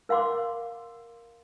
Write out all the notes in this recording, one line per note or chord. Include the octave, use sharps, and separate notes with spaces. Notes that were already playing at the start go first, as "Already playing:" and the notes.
A#4 F5 F#5 C6 D6